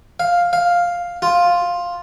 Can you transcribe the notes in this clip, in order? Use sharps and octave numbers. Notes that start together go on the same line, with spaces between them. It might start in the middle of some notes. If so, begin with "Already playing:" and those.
F5
F5
F4